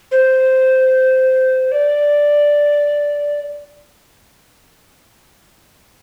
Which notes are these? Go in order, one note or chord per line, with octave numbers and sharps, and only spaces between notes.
C5
D5